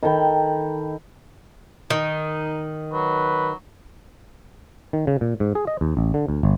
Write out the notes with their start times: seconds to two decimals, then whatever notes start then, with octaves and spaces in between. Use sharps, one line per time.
0.03 D#3 A4 G5 B5
1.90 D#3 D#4
2.93 F#3 B4
4.93 D#3
5.07 C#3
5.21 A#2
5.40 G#2
5.55 G#4
5.67 D#5
5.81 D#2
5.97 A1
6.14 D3
6.28 D2
6.43 G1